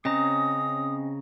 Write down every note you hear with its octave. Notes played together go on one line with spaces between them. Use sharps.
C#3 C4 C#4 D#5 A#5 D#6